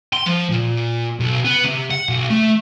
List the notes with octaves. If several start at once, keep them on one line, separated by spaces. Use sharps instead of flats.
C6
F3
A#2
B1
B3
C3
F#5
B1
A3